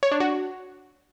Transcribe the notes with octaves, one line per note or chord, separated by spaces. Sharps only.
C#5
D4
F#4